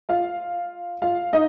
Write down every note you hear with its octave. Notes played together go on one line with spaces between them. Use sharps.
F4 F5
F4 F5
D#4 D#5